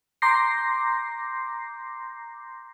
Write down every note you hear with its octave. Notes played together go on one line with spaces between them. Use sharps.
A#5 C6 D6 G6 A#6 C7